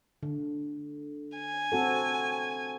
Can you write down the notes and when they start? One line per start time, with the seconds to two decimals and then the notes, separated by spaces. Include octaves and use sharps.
0.23 D3
1.38 G#5
1.72 C4 F#4 A4